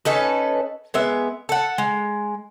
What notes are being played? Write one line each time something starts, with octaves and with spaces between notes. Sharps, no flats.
C#4 D#4 A4 B4
G#3 B3 E5
A4 F#5
G#3